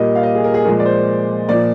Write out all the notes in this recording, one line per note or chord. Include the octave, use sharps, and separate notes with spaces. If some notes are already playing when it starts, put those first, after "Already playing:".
Already playing: A#2 G3 A#3 D#5
F5
D#5
G#4
A#4
G#4
A#2 F3 G#3 A#4
D5
C5
A#2 F3 A#3 D5